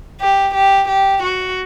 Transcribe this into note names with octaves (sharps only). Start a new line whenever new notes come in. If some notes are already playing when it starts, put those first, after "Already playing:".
G4
G4
G4
F#4